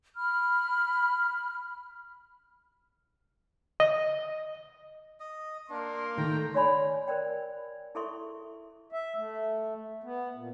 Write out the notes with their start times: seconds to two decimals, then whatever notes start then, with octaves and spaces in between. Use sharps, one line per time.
0.16 B5 F6
3.80 D#5
5.20 D#5
5.70 A#3 D4 C6
6.18 D#3 A3 G5 A#5
6.54 F#4 C#5 D5 G#5 B5 C6
7.08 A#4 C5 D5 G5
7.95 E4 G#4 A4 E5 C6 C#6
8.92 E5
9.16 A3
10.04 B3
10.35 A#2